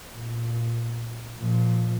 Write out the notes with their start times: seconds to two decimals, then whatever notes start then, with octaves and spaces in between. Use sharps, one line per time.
0.14 A#2
1.39 A#2 F3